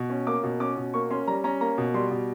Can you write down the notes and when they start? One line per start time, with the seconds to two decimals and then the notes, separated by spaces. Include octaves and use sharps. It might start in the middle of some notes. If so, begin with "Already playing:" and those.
Already playing: B2
0.10 C#4
0.27 A#3 D6
0.43 B2
0.60 C#4 D6
0.77 B2
0.94 A#3 C#6
1.11 C#4 C6
1.27 G3 A#5
1.44 C#4 A#5
1.61 A#3 A#5
1.78 B2
1.94 G3 C6
2.11 B2